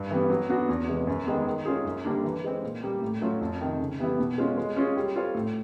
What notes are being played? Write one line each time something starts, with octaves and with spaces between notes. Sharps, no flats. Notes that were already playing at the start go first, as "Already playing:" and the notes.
Already playing: G2
E3 G3 B3
F#3
B3 D4 F#4
E2
C3 E3 G#3
F#2
D#3 G#3 B3
D#3
G#3 C#4 F4 G#4
F#2
D3 G3 A#3 D4
E3
G#3 C4
A#2
G3 A#3
A2
F#3 A3 C#4 F4
F2
C3 D#3
C#3
E3 G3 B3 E4
B2
G#3 C#4 F4
G#3
C#4 F4 G#4
G3
C4 F4 A4 C#5
A2